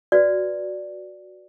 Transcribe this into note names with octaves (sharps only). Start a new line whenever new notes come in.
F#4 B4 D5